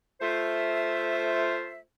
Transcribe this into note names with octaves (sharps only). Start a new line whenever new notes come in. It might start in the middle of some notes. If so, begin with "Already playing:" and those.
A3 F4 C5 E5